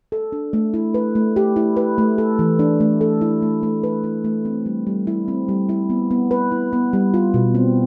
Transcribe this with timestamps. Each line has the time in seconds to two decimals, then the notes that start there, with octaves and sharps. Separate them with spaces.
0.12 A4
0.32 D4
0.53 A3
0.74 E4
0.94 B4
1.15 A3
1.36 G4
1.56 E4
1.77 B4
1.98 A3
2.18 A4
2.39 E3
2.59 D4
2.80 A3
3.01 A4
3.21 E4
3.42 A3
3.63 A3
3.83 B4
4.04 E4
4.24 A3
4.45 C4
4.66 G3
4.87 G3
5.07 E4
5.28 C4
5.48 G3
5.69 E4
5.90 B3
6.11 B3
6.31 B4
6.52 E4
6.73 B3
6.93 G3
7.14 F4
7.34 B2
7.55 C4